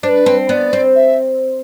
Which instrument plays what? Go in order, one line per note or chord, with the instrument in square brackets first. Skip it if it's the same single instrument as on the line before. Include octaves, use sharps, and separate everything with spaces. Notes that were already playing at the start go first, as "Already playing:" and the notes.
[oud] D4 [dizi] C5
[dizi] B4
[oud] C4
[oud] B3 [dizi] D5
[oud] C4
[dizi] E5